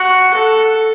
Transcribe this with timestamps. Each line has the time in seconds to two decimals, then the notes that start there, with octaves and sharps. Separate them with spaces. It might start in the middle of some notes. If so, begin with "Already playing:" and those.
Already playing: F#4
0.34 A4